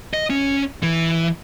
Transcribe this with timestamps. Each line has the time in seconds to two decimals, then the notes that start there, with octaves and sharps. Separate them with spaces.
0.14 D#5
0.30 C#4
0.83 E3